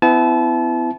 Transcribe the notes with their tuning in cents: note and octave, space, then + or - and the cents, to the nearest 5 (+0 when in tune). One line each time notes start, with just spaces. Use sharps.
B3 +45 E4 +10 A5 -30